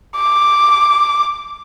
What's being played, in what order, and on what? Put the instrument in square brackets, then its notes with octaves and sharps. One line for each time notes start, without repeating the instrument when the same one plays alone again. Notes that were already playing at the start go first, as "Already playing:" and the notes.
[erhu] D6